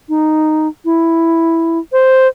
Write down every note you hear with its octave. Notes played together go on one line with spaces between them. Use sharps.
D#4
E4
C5